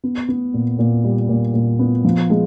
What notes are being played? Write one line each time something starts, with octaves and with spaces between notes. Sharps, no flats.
B3
B3
A#2
A#2
G3
A#2
A#2
B3
F3
G#3